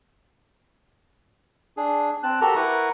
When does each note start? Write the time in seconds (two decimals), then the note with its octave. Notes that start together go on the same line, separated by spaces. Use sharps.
1.77 D4 G#4
2.23 C4 A5 F#6
2.41 F#4 G4 A4 A#4 A5 A#5
2.56 E4 A#4 B4 F#5 C#6